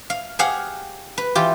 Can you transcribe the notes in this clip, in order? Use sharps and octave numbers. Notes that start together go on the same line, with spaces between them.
F5
G4 G#4 F5 F#5
B4
E3 F4 G4